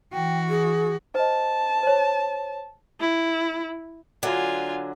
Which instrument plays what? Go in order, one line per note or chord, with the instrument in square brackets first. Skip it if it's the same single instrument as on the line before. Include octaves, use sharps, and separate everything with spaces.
[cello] E3 F#4 [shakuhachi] G5
[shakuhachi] G#4
[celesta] C5 D#5 [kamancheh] A5
[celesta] C5 C#5
[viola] E4
[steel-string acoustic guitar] D3 F#3 [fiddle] F4 G#5